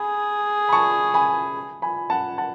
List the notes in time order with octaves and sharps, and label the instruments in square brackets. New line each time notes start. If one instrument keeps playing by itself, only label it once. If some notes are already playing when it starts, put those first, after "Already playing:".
Already playing: [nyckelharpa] G#4 [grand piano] G#5 B5
[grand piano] B5
A5 C#6
G#5 B5
G#5 B5
F#5 A5
F#5 A5